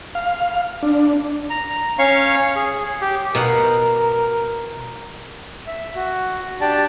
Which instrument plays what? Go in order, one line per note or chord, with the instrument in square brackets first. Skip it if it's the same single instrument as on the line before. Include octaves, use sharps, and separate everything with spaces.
[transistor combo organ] F5
D4
[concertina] A#5
C#4 C#5 F5 C#6
G#4
G4
[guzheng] B2 F5 F#5 [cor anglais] A#4
[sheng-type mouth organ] E5
F#4
D4 G4 D5 A5